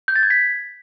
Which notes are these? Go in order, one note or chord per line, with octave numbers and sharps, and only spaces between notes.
G6
A6
G#6
B6